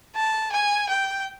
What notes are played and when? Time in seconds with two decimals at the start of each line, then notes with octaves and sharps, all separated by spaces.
0.15 A5
0.52 G#5
0.89 G5